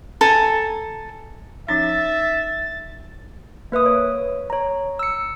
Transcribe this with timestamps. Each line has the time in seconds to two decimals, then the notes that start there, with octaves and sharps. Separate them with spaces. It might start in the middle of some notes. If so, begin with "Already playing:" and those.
0.21 A4 G#5 A#5
1.68 F3 C#4 D#4 E5 A6
3.72 A#3 B4 E5 D#6
3.86 C#5
4.50 C#5 A#5
4.99 E6 C#7